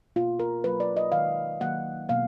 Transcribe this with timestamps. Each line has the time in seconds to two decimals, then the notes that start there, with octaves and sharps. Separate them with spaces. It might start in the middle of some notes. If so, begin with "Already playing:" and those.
0.16 B2 A#3 F4
0.40 A#4
0.64 B2 F#3 A#3 B4
0.80 D5
0.97 D#5
1.12 D#3 G#3 F5
1.60 D#3 F#3 A#3 F#5
2.09 B2 F#3 A#3 F5